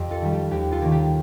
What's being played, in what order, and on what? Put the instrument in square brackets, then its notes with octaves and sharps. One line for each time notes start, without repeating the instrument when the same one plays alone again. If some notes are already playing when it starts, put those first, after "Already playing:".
Already playing: [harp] F2 G4 C5 D#5
F4 A4
D#3 G3
G4
D#2 G4
F4 A4
D#3 A#3
G4